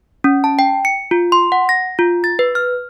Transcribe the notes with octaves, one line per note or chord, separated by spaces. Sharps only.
C#4
A5
G5
C#7
F4
C6
F#5
A#6
F4
A6
B4
F6